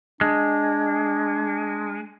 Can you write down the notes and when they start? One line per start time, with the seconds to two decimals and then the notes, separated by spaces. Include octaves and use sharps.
0.21 G#3 D4